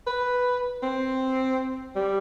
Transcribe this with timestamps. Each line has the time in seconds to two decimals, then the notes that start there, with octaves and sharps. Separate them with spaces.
0.07 B4
0.82 C4
1.96 G3